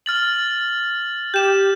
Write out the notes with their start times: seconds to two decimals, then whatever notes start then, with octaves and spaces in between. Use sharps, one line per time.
0.06 F6 A6 F#7
1.34 G4 G6 E7